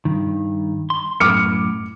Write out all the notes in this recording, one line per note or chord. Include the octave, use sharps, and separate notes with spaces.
G2 D#3
C6
F#2 A2 D6 F6 C#7